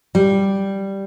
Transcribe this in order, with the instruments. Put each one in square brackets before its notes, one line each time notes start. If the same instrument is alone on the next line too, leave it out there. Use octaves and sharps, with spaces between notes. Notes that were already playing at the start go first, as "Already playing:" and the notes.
[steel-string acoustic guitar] G3